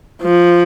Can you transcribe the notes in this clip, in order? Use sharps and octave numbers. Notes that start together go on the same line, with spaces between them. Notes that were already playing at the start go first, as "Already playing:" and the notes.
F3